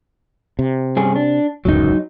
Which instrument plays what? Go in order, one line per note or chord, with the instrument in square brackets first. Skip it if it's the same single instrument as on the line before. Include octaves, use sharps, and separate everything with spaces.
[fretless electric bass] C3
[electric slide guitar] G2 C#4 G#4
D4
[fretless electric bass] D1 C#2 F#2 [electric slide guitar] F#3 D#4